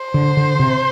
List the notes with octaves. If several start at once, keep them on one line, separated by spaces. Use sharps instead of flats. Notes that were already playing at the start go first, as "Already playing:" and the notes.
Already playing: C5
D3
D3
C3